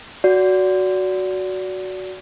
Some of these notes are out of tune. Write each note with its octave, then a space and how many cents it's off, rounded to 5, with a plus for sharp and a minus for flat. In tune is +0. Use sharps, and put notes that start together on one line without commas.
F#4 +0 D5 -30